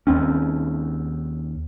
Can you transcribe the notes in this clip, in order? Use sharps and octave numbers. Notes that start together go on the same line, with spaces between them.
D#2 C4 C#4